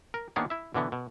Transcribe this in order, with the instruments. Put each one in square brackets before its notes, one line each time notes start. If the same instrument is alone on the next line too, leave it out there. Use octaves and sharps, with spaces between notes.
[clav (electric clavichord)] A#4
D#3 A#3 B3 D4 G#4 C#5
E4 E5
B2 D3 E3 B3
B2